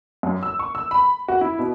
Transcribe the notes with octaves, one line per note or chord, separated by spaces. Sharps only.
F#2
E6
C#6
E6
B5
F#4
E4
B2